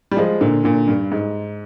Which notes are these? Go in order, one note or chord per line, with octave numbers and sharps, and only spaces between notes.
G3
F3 G#3
A#2 D3
A#2 D3
G2
G#2